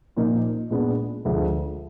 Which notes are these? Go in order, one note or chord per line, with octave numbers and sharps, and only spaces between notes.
A#2 F3 A#3 D#4
A#2 G#3 B3 D4
D2 D3 F3 G#3